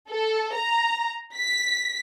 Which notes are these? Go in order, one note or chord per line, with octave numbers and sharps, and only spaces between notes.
A4
A#5
B6